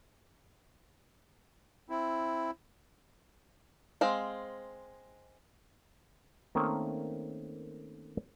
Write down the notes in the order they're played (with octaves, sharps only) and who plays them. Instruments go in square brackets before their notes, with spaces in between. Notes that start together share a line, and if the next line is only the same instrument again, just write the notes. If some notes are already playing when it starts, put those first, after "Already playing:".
[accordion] C4 E4
[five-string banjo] G#3 C4 F5
[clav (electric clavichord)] D#3 A3 A#3 C4 C#4